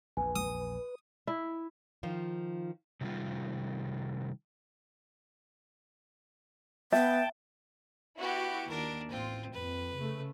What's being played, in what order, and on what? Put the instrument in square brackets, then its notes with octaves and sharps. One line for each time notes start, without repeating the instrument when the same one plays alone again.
[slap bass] A#1 E2 [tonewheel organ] B4 [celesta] G#5
[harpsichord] D#6
[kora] E4
[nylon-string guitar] D#3 F3 F4
[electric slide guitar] C3 D#3 F3 G3 F4
[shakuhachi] B3 [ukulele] E5 [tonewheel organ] G5 A5
[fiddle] B3 G4 [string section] E4 F#4
[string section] D#2 [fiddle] D4 A#4
[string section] A1 [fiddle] C4 F4
[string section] F2 [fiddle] B4
[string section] C#3 A3